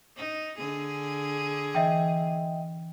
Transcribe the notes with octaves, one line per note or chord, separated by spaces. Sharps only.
D#4
D3 G#4
E3 D#5 E5 G5